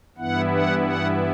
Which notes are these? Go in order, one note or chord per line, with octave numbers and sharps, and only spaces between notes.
G2 E3 B3 E4 F#5
F#5
F#5